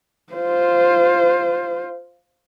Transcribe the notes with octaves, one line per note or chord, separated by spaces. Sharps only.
F4 C5